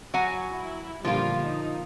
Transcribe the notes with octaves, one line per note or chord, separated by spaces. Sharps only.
F#3 F#5 G#5
E4
A#2 D3 F3 G3 A#3 F4
D#4